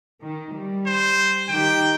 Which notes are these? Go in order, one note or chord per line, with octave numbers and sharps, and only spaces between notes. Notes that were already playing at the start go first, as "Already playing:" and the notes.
D#3
G3
C5
D#3 G4 G5